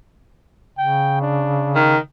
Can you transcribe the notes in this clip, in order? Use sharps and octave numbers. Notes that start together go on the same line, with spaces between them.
C#3 G5
D4
D#3